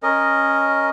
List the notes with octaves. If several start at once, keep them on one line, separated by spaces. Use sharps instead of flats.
C#4 A#4 D#5